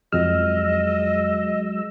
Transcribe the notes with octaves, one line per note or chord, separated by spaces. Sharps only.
F2 F#3 G#3 D#5 E6 F6